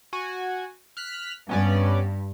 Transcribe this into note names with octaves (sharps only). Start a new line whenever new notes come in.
F#4 G#5
F6 F#6 B6
G2 B3 C#4 D5